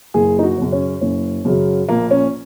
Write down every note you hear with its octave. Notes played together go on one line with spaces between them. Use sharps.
F#1 G#4
D#4
F#4
F#2 C#3 F#3
C#4
F#1 C#4
F#2 C#3 F#3
A#1 A#3
C#4